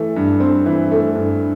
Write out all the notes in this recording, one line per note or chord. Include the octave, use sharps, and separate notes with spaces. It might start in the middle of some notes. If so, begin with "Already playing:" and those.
Already playing: E3 A3
G2
C4
E3
A3
G2